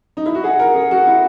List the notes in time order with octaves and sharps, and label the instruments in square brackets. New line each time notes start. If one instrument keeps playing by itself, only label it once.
[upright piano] D#4
E4
F#4
[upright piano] G#4 [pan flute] F#5
[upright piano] A#4
G#4
F#4
E4